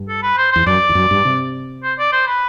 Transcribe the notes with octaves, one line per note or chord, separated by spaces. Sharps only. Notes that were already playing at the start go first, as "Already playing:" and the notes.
Already playing: G2
A4
B4
C5
E2 C5
F#2 D5
E2
F#2
G2
C3
C5
D5
C5
B4